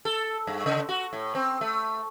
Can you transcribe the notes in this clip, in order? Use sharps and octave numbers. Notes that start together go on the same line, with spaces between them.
A4
G2
C#3
F#4
A2
C4
A3